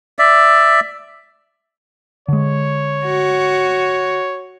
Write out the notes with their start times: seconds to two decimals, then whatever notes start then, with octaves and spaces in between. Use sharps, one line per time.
0.19 D5 E5
2.28 D3 G#3 C#5
3.05 F#4